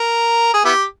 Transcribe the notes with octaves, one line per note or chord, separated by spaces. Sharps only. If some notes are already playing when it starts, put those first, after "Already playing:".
Already playing: A#4
G#4
B3 E4 G4